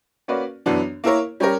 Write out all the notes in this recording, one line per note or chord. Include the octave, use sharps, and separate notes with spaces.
A#3 C#4 F#4 B4 D5
F#2 E3 B3 D4
A#3 E4 A#4 C#5
G3 C#4 G4 A#4